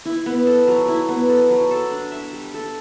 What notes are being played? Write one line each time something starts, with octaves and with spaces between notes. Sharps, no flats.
E4
B3
A4
F#3
E4
B3
A4
F#3
A4
D4
E5
G3
A4